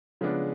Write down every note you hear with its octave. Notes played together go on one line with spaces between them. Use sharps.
C#3 F3 G#3 B3 D4